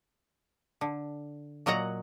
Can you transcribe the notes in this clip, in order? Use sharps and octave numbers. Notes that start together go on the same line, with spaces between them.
D3
A#2 F#3 D#5 F#5 A#5